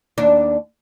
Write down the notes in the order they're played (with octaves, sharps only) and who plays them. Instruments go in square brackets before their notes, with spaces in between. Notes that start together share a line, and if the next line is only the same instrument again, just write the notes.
[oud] D#2 D4